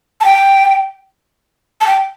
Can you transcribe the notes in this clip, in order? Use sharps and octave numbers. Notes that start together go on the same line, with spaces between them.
A5
G5
A5
G5